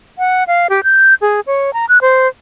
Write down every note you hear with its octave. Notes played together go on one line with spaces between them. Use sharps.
F#5
F5
G4
G6
G#4
C#5
A#5
F#6
C5